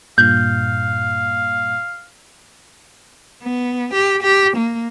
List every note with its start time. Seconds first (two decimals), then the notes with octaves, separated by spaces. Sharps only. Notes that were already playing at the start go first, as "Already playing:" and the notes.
0.18 G2 A#2 F5 G6
3.42 B3
3.93 G4
4.23 G4
4.57 A#3